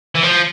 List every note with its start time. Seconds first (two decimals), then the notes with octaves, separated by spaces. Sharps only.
0.15 E3
0.23 F3